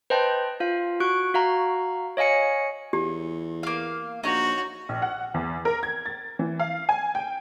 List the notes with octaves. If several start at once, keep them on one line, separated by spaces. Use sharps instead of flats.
B4 C5 D#5 G5 A5
F4 F5
F#4 C#6 F#6 D7
F#4 F5 A#5
C#5 D#5 F5 G#5 C#7
E2 G4
A#3 F5
A#1 D#4 F#4 C#5
A#1
F#5
E2
A#4
G#6
A6
E3
F5
G#5
G5